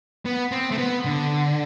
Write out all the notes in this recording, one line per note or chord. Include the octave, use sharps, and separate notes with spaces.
B3
C4
A3
B3
D3